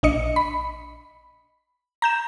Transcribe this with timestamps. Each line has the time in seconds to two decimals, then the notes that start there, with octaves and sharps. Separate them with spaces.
0.03 A#1 D4 D#5 C#7
0.36 B5
2.02 A#5 G6 E7